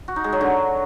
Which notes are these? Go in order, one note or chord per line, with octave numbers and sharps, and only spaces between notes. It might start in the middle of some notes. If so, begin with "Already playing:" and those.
F#4
D#4
G#3
F#3
D3